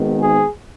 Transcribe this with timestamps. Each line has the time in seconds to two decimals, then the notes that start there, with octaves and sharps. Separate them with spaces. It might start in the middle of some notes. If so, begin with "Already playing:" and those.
Already playing: G#1 G#2 D#3 B3
0.19 G#4